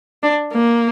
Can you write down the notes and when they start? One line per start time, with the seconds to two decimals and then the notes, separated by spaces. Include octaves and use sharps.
0.23 D4
0.52 A#3